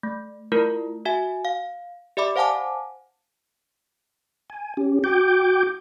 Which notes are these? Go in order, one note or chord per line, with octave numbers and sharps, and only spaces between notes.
A3
A3 E4 F4 A#4
F#4 E5 G#5
F5
G4 D5 E5 B5 D6
C5 F5 F#5 G#5 A5 D6
G#5
C#4 G4
F#4 G5 D6 G6